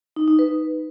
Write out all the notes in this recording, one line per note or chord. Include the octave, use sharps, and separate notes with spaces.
D#4
D#4
B4